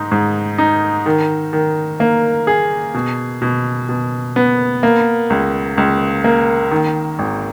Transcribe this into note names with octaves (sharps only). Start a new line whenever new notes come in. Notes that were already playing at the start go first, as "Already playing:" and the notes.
Already playing: G#2 D#4
G#2
D#4
D#3
D#3
A#3
G#4
B2
B2
B2
B3
A#3
C#2
C#2
A#3
D#3
G#1